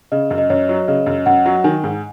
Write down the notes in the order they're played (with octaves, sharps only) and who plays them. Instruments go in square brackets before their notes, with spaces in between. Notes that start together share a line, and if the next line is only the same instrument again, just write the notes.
[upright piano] C#3 [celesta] D#5
[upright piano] F#2
[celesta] D#5
[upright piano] F#2 [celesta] C#5
[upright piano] F#3
[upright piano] C#3 [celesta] D#5
[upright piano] F#2
[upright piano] F#2 [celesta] F#5
[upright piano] F#3
[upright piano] D#3 [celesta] G#5
[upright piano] G#2